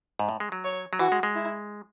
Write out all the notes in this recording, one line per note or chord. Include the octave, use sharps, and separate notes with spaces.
G#2
A2
G#3
F#3
C#5
F#3
E3 F#4
G#3
G#3
E4